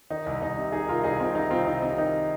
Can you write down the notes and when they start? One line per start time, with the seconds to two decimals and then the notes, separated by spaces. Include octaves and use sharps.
0.10 D#3 D#4
0.26 C2
0.42 C2 D#4
0.57 C3
0.72 D#3 D#4 G#4
0.88 C2 F4 A#4
1.03 C2 D#4 G#4
1.20 C3 C4 F4
1.35 D#3 D#4
1.50 C2 C4 F4
1.66 C2 D#4
1.82 C3 D#4
1.97 D#3 D#4